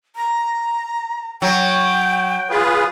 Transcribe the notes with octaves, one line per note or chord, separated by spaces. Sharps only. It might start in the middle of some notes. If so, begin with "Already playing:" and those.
A#5
F#3 G5
F4 G#4 B4